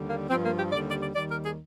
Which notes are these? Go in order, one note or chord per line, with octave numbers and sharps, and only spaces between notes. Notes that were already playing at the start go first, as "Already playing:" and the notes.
Already playing: D#2 D3 G3
A#3
G2 F3 C4
A#3
G4
D#2 D3 G3 D5
D5
D5
D#2 D#3 G3 D5
A#4
G#4